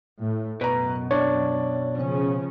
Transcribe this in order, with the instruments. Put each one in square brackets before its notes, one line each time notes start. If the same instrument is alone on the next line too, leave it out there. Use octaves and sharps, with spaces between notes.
[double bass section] A2
[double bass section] F#2 [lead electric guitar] B2 [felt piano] B4 A#5
[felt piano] D4 D5 [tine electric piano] C#5
[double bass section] C#3 F3 C#4